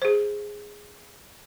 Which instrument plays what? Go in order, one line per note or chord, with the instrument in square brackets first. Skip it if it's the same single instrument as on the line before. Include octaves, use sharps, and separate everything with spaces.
[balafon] G#4 C5